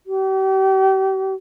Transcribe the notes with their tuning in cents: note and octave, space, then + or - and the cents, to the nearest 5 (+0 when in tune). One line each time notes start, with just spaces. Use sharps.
G4 -40